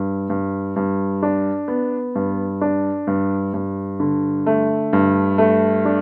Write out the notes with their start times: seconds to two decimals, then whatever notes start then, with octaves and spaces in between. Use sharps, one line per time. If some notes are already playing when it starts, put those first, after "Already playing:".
Already playing: G2
0.30 G2
0.76 G2
1.23 D4
1.68 B3
2.15 G2
2.61 D4
3.07 G2
3.54 G2
4.00 D3
4.46 A3
4.93 G2
5.38 A3
5.85 D4